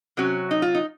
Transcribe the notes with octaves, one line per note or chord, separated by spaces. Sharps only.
C3 F#3 C#4 F#4
D#4
F4
D#4